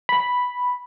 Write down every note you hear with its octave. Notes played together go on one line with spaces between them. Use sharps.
B5